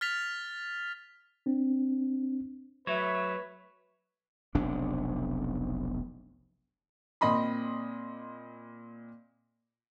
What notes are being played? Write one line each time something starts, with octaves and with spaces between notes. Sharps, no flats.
F6 A6 B6 F7
C4 D4
F#3 A3 B4 C#5 E5
F1 B1 C3 D4
A#2 C4 D#5 B5 C6